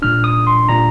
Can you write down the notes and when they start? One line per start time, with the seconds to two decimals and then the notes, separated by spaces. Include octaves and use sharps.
0.02 A#2 G3 D4 F6
0.24 D#6
0.47 C6
0.69 A#2 G3 D4 A#5